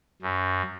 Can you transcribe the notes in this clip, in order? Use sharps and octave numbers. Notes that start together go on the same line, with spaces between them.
F#2